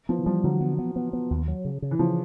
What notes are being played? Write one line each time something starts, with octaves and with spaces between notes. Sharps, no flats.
F3 B3
E3
F3 G3
D3 F#3
B3
B3
B3
B3
D#2
F#3
C#3
C#3
E3
C#3 F3